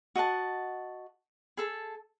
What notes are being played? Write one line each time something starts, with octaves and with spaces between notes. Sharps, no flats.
F#4 D#5 F#5 A5
G#4 A4 A5